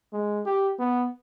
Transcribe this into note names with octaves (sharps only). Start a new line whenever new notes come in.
G#3
G4
B3